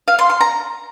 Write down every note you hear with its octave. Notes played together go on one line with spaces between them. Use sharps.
F5
C6
C6
A#5